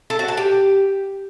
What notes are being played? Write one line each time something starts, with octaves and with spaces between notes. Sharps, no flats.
A4
F#4
A5
G4